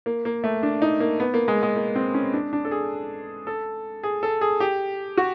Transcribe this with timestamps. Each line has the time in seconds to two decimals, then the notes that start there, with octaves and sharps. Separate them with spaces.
0.06 A#3
0.25 A#3
0.44 A3
0.63 D4
0.82 D#4
1.00 A#3
1.20 B3
1.34 A#3
1.48 G#3
1.63 G#3
1.76 A#3
1.95 C4
2.14 C#4
2.33 D4
2.53 D4
2.65 A4
2.71 G#4
3.47 A4
4.03 G#4
4.23 A4
4.41 G#4
4.60 G4
5.17 F#4